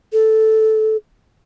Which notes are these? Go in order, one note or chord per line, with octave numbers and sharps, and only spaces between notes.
A4